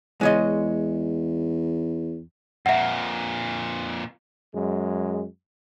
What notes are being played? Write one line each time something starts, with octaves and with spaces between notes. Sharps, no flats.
E2 G#3 C#5 D#5
F2 A#2 E5 F#5
F#2 G#3